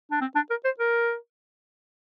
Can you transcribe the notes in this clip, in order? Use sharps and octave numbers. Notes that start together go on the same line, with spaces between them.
D4
C4
D4
A#4
C5
A#4